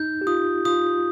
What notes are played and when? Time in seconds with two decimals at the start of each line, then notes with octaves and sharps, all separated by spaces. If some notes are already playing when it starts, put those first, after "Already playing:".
Already playing: D#4 G6
0.21 G4
0.27 F4 D#6
0.65 F4 D#6